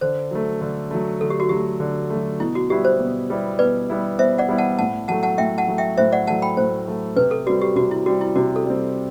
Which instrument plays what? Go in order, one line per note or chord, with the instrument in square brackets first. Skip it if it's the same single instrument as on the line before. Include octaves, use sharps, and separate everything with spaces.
[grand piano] D3 [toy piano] C5
[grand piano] F#3 A3
D3
F#3 A3
[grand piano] D3 [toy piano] A4
[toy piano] G4
F#4
[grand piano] F#3 A3 [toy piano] G4
[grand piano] D3
F#3 A3
[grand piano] B2 [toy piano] E4
[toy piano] F#4
[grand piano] G3 B3 E4 [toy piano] G4
[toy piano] C5
[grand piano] B2
G3 B3 E4
[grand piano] B2 [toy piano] B4 D5
[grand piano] G3 B3 E4
[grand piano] B2 [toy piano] C5 E5
[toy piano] D5 F#5
[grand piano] G3 B3 E4
[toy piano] F#5 A5
[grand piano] A2 [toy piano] F#5 A5
[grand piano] F#3 A3 [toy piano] F#5 A5
[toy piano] F#5 A5
[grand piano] A2 [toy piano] E5 G5
[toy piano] F#5 A5
[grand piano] F#3 A3
[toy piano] E5 G5
[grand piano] A2 [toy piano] C5 E5
[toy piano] D5 F#5
[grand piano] F#3 A3 [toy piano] F#5 A5
[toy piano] G5 B5
[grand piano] A2 [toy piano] C5
[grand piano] F#3 A3
[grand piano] C3 [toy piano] B4
[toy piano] A4
[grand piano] G3 C4 [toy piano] F#4
[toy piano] G4
[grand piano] C3 [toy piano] F#4
[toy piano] E4
[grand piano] G3 C4 [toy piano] F#4
[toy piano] E4
[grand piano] C3 [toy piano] F#4
[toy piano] A4
[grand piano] G3 C4